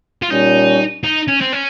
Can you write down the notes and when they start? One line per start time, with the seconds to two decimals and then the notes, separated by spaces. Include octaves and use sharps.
0.22 F4
0.30 A#2 G3 C#4 D#4
1.04 D#4
1.28 C#4
1.41 C4
1.53 C#4